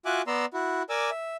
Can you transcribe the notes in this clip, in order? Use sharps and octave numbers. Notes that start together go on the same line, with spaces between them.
F4 F#4 E5 G#5 D6 F#6
B3 D5 A#5 C6 E6
E4 F#4
A#4 D5 G#5 D6 E6
E5